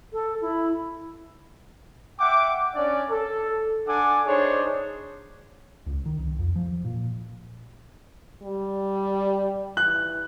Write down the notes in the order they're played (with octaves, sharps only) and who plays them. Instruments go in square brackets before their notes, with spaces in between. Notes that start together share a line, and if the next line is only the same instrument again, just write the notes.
[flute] A4
E4
[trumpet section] E5 F#5 G5 D6
C#4 D4 D5
A4
D4 A4 F#5 G#5 D6
D4 D#4 G#4 C5 C#5
[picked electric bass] C#2
D#3
C2
F2
F3
A#2
[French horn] G3
[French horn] E3 [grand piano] F#6